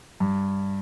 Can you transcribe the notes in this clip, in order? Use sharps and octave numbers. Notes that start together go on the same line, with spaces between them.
G2